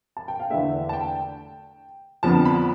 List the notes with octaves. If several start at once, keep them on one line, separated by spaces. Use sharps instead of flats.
A5
G5
F5
E2 D3 A3 E5
A5
G5
F2 D3 F3 B3 A5
B5